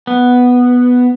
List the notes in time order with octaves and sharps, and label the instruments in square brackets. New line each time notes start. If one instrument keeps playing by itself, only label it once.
[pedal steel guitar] B3